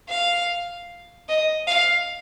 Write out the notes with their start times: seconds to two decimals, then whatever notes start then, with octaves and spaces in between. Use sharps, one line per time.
0.09 F5
1.29 D#5
1.67 F5